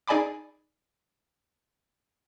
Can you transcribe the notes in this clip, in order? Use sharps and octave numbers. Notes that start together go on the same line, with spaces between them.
D#4 G#4 D5 G#5 B5 D6